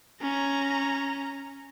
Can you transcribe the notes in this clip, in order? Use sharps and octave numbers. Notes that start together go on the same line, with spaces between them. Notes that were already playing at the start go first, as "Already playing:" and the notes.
C#4 A#5